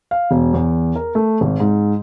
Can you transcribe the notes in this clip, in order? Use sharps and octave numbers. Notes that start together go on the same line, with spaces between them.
F5
E1
E2
A#4
A3
G#1
G#2